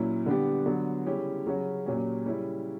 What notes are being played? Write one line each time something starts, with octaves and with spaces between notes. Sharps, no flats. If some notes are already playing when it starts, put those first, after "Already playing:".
Already playing: A#2 F#3 C#4 E4
D3 G3 B3 D4 G4
D3 F#3 B3
C#3 G3 C#4 E4 G4
C#3 F#3 C#4 F#4
A#2 F#3 C#4 G4
C#3 G3 C#4 E4